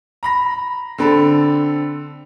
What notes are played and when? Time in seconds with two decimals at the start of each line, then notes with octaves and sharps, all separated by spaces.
0.23 A#5 B5 A#6
0.98 D3 C4 A4 B5